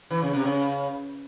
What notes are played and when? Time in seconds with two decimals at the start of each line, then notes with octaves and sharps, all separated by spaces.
0.10 E3
0.22 C#3
0.33 C3
0.44 C#3